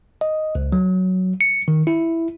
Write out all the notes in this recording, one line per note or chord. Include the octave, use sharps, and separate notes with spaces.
D#5
C#2
F#3
C#7
D#3
E4